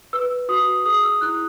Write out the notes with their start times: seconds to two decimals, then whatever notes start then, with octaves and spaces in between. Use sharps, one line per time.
0.13 B4 E6
0.49 F#4 D#6
0.85 G#4 D#6
1.03 E6
1.21 E4 F#6